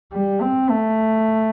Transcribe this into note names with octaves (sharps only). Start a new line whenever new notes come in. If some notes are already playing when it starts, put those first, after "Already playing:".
G3
C4
A3